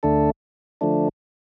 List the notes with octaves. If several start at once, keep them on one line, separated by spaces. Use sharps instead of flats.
D2 D3 A3 D4 A4
D3 F3 A3 D4